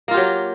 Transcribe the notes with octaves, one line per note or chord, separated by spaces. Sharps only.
F#3 A#3 F4 G4